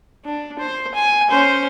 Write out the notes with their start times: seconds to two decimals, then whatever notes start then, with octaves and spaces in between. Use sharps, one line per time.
0.25 D4
0.59 C5
0.95 G#5
1.30 C#4 C5